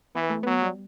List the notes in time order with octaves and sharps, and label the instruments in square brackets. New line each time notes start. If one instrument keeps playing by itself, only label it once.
[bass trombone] E3 [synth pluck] B3
[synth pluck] A3
[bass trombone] F#3 [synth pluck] B3
[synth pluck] G3